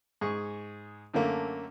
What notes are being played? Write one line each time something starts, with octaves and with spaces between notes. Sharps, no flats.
G#2 G#4 C#6
F#2 D3 A3 A#3